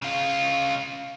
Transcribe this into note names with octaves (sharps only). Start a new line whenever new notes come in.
C#3 F4